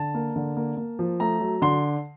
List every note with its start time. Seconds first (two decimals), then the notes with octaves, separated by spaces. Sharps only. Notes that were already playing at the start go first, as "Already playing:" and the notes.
Already playing: D3 A5
0.14 A#3
0.36 D3
0.57 A#3
0.77 A#3
0.99 F3
1.20 A3 A#5
1.41 F#3
1.62 D3 C6